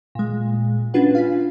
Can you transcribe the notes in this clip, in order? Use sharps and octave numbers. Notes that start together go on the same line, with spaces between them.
A#2 G#3
C#4 D4 F4 B4 F#5
F5 G#5 B6